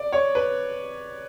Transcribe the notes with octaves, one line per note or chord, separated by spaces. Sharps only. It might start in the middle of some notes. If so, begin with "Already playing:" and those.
Already playing: D5
C#5
B4